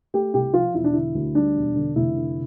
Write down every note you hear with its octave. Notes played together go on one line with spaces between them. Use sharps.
A3 G4
C2 G4
F3 F4
E1 E4
D4
D3 E4
D2
G3 D4
E1
D3
F1 E4
D3